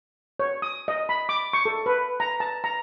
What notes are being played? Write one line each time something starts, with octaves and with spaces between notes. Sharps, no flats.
C#5
D#6
D#5
B5
D6
C#6
A4
B4
A#5
A5
A#5